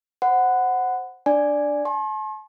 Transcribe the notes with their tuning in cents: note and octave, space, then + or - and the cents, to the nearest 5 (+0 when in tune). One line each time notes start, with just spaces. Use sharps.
C5 +0 F#5 +0 B5 +35
D4 +0 D5 +0 G#5 +0
A5 -40 C6 +45